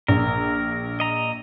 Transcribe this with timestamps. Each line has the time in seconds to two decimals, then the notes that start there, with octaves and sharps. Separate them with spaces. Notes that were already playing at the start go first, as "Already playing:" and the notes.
0.08 A#1 A#4
1.00 D#5 A#5